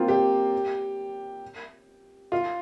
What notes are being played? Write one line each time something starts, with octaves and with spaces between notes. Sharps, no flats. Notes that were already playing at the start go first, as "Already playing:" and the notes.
Already playing: A#3 C4 F4
G4
F4